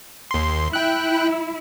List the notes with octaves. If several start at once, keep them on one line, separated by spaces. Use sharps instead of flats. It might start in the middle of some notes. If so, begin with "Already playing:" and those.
D#2 C6
E4 G5 F#6